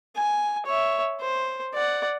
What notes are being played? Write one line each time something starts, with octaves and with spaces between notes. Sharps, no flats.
G#5
C#5 E5
C5
D5 F#5